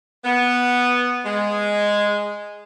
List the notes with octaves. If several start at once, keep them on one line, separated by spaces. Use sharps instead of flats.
B3
G#3